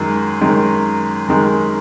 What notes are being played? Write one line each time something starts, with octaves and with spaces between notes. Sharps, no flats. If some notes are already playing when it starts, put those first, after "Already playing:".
Already playing: F#2 D#3 G#3
F#2 D#3 G#3
F#2 D#3 G#3